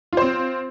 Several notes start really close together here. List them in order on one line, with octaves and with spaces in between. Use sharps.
F4 C5 C4